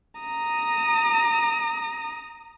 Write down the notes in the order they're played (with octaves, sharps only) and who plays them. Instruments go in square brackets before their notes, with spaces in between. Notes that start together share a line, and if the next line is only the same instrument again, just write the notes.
[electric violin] A#5 D#6